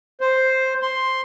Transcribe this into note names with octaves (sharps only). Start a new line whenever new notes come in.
C5
C6